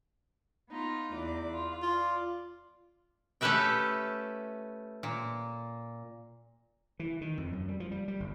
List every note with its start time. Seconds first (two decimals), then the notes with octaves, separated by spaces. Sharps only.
0.69 B3 D#4 F4
1.12 E2 D5
1.53 F4
1.82 F4 D5
3.41 A3 C#4 G4 B4 E5 G5
5.03 A#2
7.00 E3
7.21 D#3
7.38 F2
7.53 F#2
7.68 G3
7.80 F3
7.91 G3
8.08 G3
8.20 G1